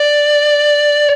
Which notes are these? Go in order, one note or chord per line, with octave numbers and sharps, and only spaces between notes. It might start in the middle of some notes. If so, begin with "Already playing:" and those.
Already playing: D5